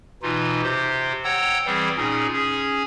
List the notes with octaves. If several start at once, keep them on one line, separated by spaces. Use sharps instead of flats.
B2 E3 D#4 F4
C3 G4 C5
C#5 F#5 G5 A#5 E6
E3 G3 C4 G#4
A#2 C#4 D#4 G#4
C#4 G#4